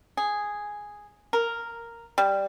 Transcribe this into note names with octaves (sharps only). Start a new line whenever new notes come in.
G#4
A#4
G3